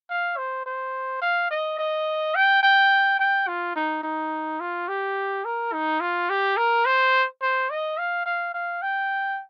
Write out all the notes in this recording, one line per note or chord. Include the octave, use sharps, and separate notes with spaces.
F5
C5
C5
F5
D#5
D#5
G5
G5
G5
F4
D#4
D#4
F4
G4
A#4
D#4
F4
G4
A#4
C5
C5
D#5
F5
F5
F5
G5